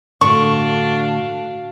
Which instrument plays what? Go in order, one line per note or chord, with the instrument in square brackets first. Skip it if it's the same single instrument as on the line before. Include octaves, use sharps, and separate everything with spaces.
[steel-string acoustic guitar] A2 D3 [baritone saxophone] D4 [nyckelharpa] F#4 F5 [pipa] C#6